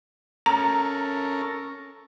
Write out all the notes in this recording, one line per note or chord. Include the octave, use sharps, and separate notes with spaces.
C#4 A4 A#4 A#5